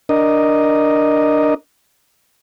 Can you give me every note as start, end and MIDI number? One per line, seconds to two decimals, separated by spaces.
0.09 1.54 62
0.09 1.54 70
0.09 1.54 75